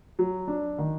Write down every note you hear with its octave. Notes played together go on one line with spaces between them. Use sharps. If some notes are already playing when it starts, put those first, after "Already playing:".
F#3
D4
D#3